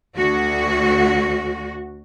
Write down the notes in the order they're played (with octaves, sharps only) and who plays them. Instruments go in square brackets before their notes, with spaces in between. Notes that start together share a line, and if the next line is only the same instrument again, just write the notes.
[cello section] D2 F#4